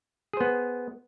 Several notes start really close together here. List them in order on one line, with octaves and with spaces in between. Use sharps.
G#4 C5 B3